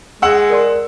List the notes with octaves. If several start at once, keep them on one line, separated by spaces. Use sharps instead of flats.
G#3 F#5 E6
A#4 D5 C6